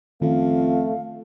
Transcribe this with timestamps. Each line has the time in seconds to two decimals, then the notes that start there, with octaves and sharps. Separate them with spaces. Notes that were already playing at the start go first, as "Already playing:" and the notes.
0.22 F2 D#3 A3 C#4 F5